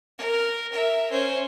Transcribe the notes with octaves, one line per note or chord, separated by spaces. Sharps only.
A#4
A#4 E5
C#4 C5